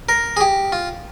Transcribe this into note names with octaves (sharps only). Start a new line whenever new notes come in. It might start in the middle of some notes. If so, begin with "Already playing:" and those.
A#4
G#4
G4
F4